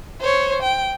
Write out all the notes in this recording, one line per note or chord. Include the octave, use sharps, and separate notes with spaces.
C5 C#5
G5